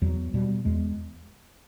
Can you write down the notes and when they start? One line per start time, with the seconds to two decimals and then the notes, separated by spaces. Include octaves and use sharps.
0.02 E2 F#3
0.34 B2 G3
0.65 E2 G#3